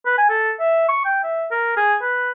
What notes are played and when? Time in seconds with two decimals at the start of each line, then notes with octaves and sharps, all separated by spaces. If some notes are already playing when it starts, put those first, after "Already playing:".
0.06 B4
0.18 G#5
0.30 A4
0.60 E5
0.89 C#6
1.05 G5
1.24 E5
1.51 A#4
1.77 G#4
2.02 B4